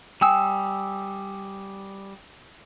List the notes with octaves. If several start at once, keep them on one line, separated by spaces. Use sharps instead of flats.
G3 G5 G#5 D#6 E6